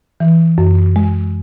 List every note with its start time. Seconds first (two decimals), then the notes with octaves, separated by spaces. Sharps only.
0.20 E3
0.58 F#2
0.96 G#3